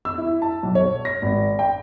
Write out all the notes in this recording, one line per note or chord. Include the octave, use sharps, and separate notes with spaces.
E6
E4
A5
B1
C#5
A#6
G#1
G5